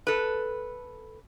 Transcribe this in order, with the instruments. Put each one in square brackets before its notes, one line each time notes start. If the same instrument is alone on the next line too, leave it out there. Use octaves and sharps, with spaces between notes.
[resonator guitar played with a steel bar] A4 B4